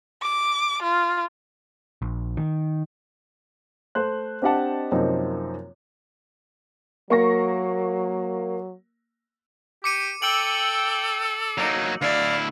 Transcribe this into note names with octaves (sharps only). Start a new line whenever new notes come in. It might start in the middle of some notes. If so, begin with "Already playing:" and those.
D6
F4
A#1
D#3
A3 C5 F#6
C4 D4 G4 D#5 F#5 A5
F#2 C3 F3 A#3 C4 D#4
F#3 A#3 C#6 A#6
G4 D6 C#7 D#7
A4 G5 E6 D7 F#7
F#3 A#3 D#4
D2 E4 D5 F5